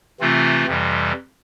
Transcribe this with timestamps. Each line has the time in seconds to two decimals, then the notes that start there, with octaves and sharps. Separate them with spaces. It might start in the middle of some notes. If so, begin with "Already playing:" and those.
0.20 C3 E3 A3 C4 F4
0.66 F2 C3 E3 G3